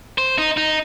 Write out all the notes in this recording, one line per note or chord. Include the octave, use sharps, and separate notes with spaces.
C5
D#4
D#4